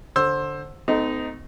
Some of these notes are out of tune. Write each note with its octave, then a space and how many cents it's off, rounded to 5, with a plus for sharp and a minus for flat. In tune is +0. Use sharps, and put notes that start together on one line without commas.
D3 +0 C5 +20 E6 +0
A3 +0 C4 -40 D#4 +0